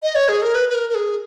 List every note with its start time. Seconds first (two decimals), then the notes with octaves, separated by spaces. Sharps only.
0.03 D#5
0.15 C#5
0.29 G#4
0.42 A#4
0.55 B4
0.69 B4
0.75 A#4
0.90 A#4
0.95 G#4